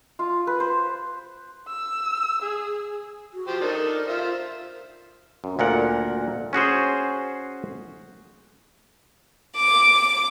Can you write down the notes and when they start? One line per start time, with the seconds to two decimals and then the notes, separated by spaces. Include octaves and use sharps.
0.19 F4
0.47 B4
0.60 C5
1.68 E6
2.42 G#4
3.34 F#4
3.47 F3 G4 C5
3.61 D4 D#4 A4 A#4
4.08 F4 C5 E5
5.44 F#2
5.59 D2 A#2 A#4 F#5
6.53 C#4 F#4 G#4 C5
9.56 D6